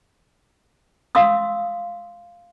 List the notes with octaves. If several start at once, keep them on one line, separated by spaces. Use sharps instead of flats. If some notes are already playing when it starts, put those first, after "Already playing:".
F5 C6 D#6 E6